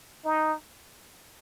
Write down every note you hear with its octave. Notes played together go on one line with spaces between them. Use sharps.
D#4